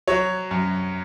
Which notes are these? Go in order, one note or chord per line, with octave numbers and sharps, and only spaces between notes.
F#3 C#5
F#2